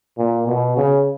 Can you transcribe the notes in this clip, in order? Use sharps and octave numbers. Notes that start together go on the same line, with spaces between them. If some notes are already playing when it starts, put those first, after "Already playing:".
A#2
B2
C#3